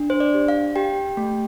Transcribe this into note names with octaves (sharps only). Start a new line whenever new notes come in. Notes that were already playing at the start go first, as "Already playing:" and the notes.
Already playing: D4
C5
D5
G4
F5
G4 G5
A3